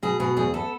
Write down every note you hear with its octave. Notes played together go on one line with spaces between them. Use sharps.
B2 G#4
B2 G#4
E2 G#4
B3 A4